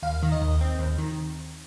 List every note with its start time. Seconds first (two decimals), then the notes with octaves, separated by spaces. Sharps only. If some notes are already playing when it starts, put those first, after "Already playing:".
0.02 D#2 F5
0.23 D#3
0.32 D#5
0.42 D#2
0.61 C4
0.79 D#2
0.98 D#3